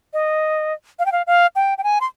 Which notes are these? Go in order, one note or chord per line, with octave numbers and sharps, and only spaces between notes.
D#5
F5
G5
F5
F5
G5
G5
G#5
C6